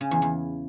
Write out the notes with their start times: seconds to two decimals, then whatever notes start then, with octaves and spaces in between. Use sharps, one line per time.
0.01 C#3
0.11 E2
0.22 E2